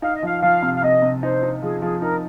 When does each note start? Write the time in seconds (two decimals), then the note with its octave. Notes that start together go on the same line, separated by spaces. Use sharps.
0.02 D#4 F5
0.15 D#5
0.22 F3 F5
0.42 F3 F5
0.62 C3
0.75 F5
0.82 C3 D#5
1.02 C3
1.22 D#4 C5
1.43 D#4
1.62 F3 G#4
1.82 F3 G#4
2.02 D#4 A#4